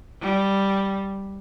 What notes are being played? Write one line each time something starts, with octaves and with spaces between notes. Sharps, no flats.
G3